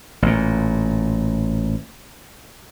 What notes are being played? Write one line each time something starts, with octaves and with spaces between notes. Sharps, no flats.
A1 A#2